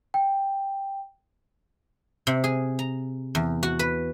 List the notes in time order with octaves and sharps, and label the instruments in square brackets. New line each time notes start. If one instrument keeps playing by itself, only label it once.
[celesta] G5
[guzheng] C3
G#4
A#5
E2
F#4
B4